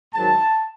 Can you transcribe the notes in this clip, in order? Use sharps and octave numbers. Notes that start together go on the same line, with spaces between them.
G#2 D#3 F#3 A5